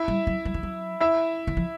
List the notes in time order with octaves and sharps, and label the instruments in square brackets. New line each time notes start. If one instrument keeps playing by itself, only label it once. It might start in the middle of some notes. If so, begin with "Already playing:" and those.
Already playing: [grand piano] E4 E5
[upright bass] G3
F#3
F#3
F3
F#3
[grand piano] E4 E5
[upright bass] E3
F3